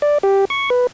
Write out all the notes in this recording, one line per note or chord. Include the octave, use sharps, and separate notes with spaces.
D5
G4
C#6
B4